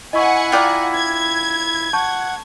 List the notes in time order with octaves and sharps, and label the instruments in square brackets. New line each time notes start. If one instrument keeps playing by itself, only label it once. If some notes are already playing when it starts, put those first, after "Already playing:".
[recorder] E4 [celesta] D#5 C#6 [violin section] F#5 G#5
[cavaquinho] F4 D5 A#5 [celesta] G5 F#6 G6
[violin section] G#6
[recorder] F#5 [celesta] A5 C#6 G6